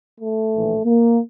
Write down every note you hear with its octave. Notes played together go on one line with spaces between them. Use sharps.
A3
A#1 A2 E3
A#3